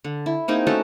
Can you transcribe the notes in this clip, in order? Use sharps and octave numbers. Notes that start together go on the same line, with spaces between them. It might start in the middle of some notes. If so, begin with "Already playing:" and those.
D3
E4
A#3 C4 D#4 G#4
A3 C#4 F#4 A4